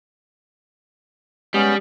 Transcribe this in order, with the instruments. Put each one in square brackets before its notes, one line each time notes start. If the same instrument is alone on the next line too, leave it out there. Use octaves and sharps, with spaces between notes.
[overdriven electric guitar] G3 [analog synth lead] G#3 [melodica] B3 C#4